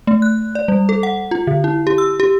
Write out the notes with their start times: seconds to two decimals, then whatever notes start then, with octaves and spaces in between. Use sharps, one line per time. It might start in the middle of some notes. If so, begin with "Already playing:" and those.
0.07 A3
0.22 F#6
0.55 D5
0.68 G3
0.89 A4
1.03 F#5
1.31 F4
1.47 D3
1.64 E4
1.87 G4
1.98 E6
2.20 G4